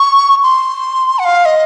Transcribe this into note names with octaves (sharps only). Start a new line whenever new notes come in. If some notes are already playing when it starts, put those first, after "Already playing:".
Already playing: C#6
C6
F#5
F5
D#5